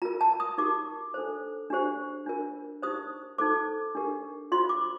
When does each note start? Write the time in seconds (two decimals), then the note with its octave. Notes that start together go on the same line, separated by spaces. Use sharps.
0.02 F4 A#4 A#5
0.21 A5
0.40 D#6
0.58 D#4 G4 A#4 D6
1.14 D4 A4 C5
1.70 D4 G4 C5
2.26 D4 F4 A#4
2.82 D#4 G4 C5 D#6
3.38 D#4 A4 C5 D6
3.95 D4 G4 A#4
4.52 F4 C5 C6
4.69 D6